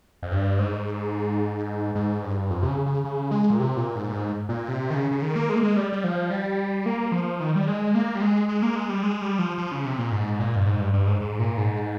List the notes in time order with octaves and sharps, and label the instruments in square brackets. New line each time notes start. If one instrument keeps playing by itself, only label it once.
[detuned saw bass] F2
G2
G#2
G#2
G2
F2
C3
C#3
C#3
C#3
G#3
A#2
C3
A#2
G#2
A#2
G#2
A#2
C3
D#3
C#3
C#3
D#3
A#3
G#3
A#3
G#3
G3
G3
F3
G3
A#3
F3
D#3
G3
G#3
A#3
G3
G#3
G#3
A#3
G#3
G3
G#3
G3
F3
F3
C#3
C3
A#2
G#2
A#2
G2
G#2
G2
G2
G#2
G#2
A#2
G#2